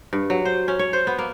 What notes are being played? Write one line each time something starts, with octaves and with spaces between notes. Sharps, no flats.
G2
F#3
C5
C#4
C#5
C5
B3
A#3